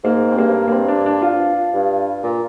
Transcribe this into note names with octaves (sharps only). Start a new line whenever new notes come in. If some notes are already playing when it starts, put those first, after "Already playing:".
G#2 A#3
C4
G2 A#3
A#3
C4
D4
D4
F4
G2
A#2